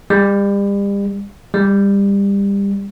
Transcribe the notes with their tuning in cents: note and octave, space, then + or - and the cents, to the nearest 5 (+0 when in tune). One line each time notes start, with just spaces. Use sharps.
G3 +35
G3 +25